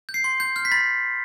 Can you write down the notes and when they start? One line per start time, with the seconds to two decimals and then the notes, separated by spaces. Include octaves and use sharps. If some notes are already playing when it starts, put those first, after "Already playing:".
0.09 G6
0.14 C7
0.24 C6
0.40 G6
0.56 F6 G6
0.65 B6
0.71 B5 A6